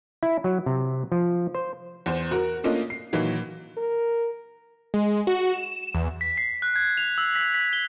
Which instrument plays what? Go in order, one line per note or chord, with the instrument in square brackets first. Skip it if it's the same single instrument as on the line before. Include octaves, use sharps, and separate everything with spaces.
[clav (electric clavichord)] E4
F#3
C3
F3
C5
[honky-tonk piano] E2 C5
F#4 A#4
A3 A#3 C#4 D4 F4 D#5
C7
A#2 D#3 E3 F#3
[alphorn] A#4
[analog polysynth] G#3
F#4
E7
E2
[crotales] B6
C7
F#6
G#6
F7
E6
B6
B6
G7